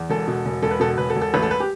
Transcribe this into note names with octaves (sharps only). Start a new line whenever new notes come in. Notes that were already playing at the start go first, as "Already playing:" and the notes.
Already playing: E2
E1 A4
B2
E1
E1 A4
B4
B2 A4
E1 B4
A4
E1
A4
A1 B4
A4
B4
G4